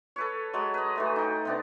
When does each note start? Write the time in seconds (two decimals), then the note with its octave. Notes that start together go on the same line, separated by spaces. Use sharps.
0.16 A4 B4 C#5
0.53 F#3 G#3 A5
0.74 B4 D#5
0.96 E3 F#3 A3
1.16 D#4 G5
1.45 C3 B3 D4